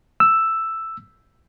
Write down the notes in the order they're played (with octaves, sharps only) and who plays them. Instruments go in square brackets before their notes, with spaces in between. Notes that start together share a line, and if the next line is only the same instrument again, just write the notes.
[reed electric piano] E6